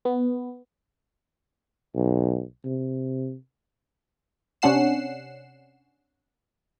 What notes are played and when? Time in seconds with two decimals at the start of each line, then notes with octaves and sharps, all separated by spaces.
0.05 B3
1.95 B1
2.65 C3
4.62 C3 C#4 D4 F#5 C7 E7